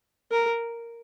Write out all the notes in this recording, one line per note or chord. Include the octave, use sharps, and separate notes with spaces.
A#4